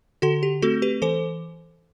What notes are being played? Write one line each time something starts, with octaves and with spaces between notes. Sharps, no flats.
D3 F#4 A4
G4
A3 C4 F#4 A4
G4 B4
E3 A4 C5